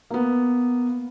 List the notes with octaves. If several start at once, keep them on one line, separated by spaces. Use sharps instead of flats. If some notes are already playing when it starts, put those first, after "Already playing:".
A#3 B3